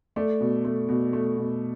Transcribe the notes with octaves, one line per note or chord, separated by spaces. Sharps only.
A3 D5
B2
A3
B2
A3
B2